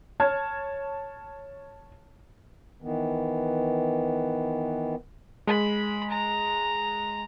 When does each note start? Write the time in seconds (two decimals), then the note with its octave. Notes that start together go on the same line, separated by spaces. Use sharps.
0.20 C#5 A5 F6 G#6
2.82 D#3 E3 B3
5.47 G#3 B5
6.10 A#5